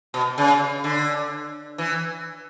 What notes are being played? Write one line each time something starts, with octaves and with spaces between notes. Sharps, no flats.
B2
C#3
D3
E3